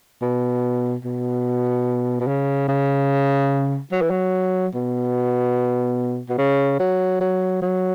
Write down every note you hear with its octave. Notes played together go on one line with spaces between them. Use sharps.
B2
B2
B2
C#3
C#3
F#3
E3
F#3
B2
B2
C#3
F#3
F#3
F#3